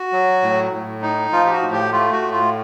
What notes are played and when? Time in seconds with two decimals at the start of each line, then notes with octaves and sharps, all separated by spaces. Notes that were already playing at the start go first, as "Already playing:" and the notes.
Already playing: F#4
0.13 F#3
0.43 A2
0.72 A2
1.02 D#4
1.32 F3 F4
1.46 G4
1.52 F#4
1.62 A2
1.72 G4
1.92 A3 F4
2.12 F#4
2.22 A2
2.32 F4